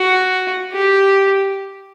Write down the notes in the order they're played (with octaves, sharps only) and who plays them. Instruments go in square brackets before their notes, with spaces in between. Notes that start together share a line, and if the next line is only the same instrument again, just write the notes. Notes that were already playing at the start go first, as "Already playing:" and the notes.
Already playing: [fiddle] F#4
G4